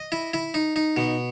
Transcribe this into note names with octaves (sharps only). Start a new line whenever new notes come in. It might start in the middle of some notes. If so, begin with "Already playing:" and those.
Already playing: D#5
E4
E4
D#4
D#4
B2